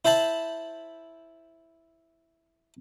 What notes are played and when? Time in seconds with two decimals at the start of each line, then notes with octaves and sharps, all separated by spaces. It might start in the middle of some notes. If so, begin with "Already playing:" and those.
0.05 E4 C5 E5 A5 B5